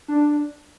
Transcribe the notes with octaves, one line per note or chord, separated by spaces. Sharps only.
D4